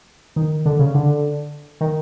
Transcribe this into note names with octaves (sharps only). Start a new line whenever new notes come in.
D#3
D3
C#3
D3
D#3